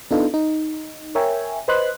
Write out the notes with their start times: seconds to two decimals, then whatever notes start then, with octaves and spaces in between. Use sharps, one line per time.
0.11 B3 D4 D#4 F4 A4
0.34 D#4
1.15 A#4 C#5 E5 G5 G#5
1.68 B4 C5 D#5 B5 C6 F#6